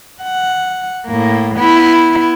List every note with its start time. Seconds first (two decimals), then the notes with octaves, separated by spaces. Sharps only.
0.23 F#5
1.07 A2 A#3
1.57 B3 E4